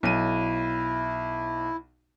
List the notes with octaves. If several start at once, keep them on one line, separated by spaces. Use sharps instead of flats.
B1 E4 D#7